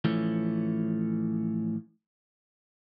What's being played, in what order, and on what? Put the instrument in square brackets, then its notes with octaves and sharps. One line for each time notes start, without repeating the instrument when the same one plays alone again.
[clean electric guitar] A2 E3 F3 A3 C#4